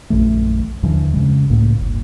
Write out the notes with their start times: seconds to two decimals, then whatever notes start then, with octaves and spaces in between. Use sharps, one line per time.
0.10 A#1 F#2 E3 A3
0.83 D#2 D3 E3 F3
1.13 F2 C#3 G#3
1.50 C#2 A2 A#3
1.81 G1